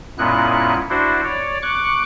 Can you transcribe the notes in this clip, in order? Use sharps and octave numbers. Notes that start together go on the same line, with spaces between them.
F#2 A#2 G#3 B3 E4 F#6
D4 E4 F#4 C5
C#5 D5
C#6 D6 F#6